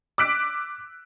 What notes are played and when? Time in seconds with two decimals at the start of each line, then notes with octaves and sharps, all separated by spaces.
0.18 D6 E6 F#6 B6 D7